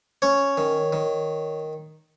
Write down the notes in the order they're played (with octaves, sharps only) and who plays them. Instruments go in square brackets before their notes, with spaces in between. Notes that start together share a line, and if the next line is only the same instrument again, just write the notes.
[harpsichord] C#4 C#5
D#3
D#3